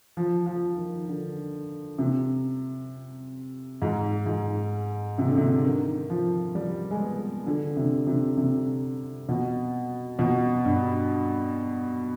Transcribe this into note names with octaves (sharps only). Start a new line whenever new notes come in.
F3
F3
D#3
D3
C3
G#2
G#2
C3
D3
C3
D#3
F3
G3
G#3
B3
D3
C3
C3
C3
B2
B2
G2